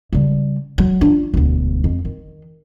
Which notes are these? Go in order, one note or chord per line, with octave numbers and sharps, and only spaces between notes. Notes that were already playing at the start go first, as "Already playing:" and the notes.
C#3 G3
F#3
D4 F4
E1 D2
F2
D#3